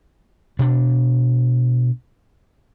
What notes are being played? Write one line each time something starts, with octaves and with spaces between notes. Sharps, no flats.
B2 D4